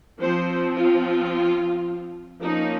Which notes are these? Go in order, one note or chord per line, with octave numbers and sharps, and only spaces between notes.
F3 C4 C5
F4
F3 A#3 C#4 D#4